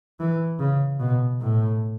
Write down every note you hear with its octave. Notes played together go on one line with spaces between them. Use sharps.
E3
C#3
B2
A2